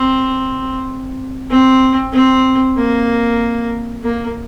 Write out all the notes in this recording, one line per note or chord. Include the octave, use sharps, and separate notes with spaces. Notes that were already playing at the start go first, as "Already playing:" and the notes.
Already playing: C4
C4
C4
A#3
A#3